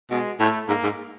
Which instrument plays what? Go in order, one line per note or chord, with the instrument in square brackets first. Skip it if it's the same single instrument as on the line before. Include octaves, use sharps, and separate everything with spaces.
[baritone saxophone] B2 [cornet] G#3
[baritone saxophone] A2 [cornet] A3
[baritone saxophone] G#2 [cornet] A#3
[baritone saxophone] G#2